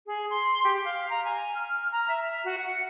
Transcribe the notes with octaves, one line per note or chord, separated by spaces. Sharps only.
G#4
C6
G4
F5
A#5
G#5
F6
A#5
E5
F#4
F#5